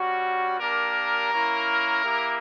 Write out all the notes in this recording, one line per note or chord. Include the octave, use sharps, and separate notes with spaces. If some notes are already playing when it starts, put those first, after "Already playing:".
Already playing: G3 C#4 F#4
A#3 D4 G4 A#4
A#3 C#4 E4
A#3 E4 G4